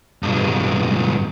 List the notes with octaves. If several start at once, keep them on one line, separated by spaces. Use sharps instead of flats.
B1 G2